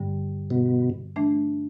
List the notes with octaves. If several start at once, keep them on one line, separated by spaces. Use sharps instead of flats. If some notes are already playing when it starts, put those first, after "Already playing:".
Already playing: G2 D3 G3
B2
E3 A3 D4